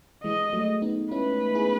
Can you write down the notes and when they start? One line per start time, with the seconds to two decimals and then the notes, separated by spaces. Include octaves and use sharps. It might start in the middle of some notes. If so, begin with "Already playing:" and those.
0.24 E3 G#3 D#5
0.53 F#3 A3
0.82 B3 D#4
1.11 C#4 E4 B4
1.55 E4 G#4